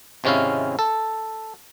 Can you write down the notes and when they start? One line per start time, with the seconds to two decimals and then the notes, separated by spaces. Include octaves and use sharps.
0.24 G#1 C3 G#3 C#4 E4 F5
0.79 A4